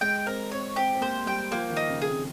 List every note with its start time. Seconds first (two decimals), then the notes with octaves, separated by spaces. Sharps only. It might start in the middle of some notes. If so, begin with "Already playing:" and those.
0.01 G#3 G5
0.27 C4 A#4
0.52 C4 C#5
0.76 C4 G4
0.95 C4
1.01 A#3 C5
1.26 G3 G5
1.51 F3 A#3
1.70 D#3
1.77 D#4
1.89 C#3
2.02 G#4
2.08 C3